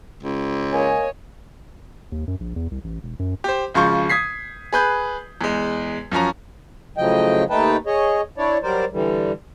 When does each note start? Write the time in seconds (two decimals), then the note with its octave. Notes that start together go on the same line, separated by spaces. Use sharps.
0.23 C#2
0.73 A#3 C#5 D#5 G#5
2.12 D#2
2.27 F#2
2.40 A#1
2.56 E2
2.71 C2
2.84 A1
3.03 E1
3.19 F#2
3.44 G4 C5
3.74 G#1 C#3 F3 C6 C#6 G6
4.09 D#6 G#6 B6 C7
4.73 G#4 B4 G6
5.41 E2 G#3
6.11 F#2 F3 C#4 A#5
6.98 A2 C#3 F3 F#3 D#5 G5
7.50 D#2 A3 D#4 B4 G5 A5
7.86 G#4 C#5 D#5
8.38 D4 E4 C#5 D5
8.63 F#3 G3 A#4 C5 D5
8.92 D3 E3 G3